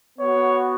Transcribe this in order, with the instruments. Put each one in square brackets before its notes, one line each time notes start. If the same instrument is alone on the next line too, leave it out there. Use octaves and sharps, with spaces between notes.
[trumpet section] B3 F#4 C#5